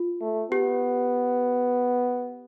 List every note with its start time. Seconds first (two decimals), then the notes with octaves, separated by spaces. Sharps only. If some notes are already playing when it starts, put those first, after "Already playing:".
Already playing: F4
0.21 A3
0.52 B3 G4